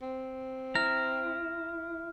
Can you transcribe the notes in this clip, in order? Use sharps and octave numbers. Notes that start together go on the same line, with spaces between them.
C4
E4 A#5 F6